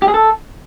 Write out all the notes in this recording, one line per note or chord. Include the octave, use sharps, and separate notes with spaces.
G4
G#4
A4